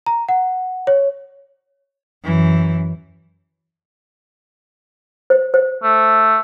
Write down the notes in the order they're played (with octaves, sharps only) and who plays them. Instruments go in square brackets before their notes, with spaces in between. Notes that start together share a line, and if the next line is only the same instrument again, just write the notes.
[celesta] A#5
F#5
C#5
[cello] F#2 E3
[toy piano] C5
C5
[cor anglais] A3